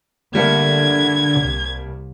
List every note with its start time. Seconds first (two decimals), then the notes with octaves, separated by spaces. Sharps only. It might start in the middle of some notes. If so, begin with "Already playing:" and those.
0.35 D3 G3 A3 A#3 G#6
1.40 C2